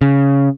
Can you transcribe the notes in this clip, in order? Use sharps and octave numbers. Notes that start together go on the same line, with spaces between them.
C#3